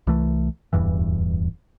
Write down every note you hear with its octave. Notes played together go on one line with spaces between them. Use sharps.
C2 E3 A3
D1 E2 G2 E3